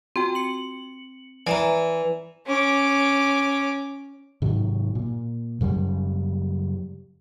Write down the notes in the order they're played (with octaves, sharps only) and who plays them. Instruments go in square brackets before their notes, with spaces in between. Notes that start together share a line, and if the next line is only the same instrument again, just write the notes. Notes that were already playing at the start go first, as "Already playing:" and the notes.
[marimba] C4 [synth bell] F4 F#4 G5
[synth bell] C#7 F#7
[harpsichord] E3 [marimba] D5 E5 A#5
[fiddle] C#4 D6
[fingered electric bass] G#2 C3 D#3 F#3
A#2
F#2 C#3 F#3 G3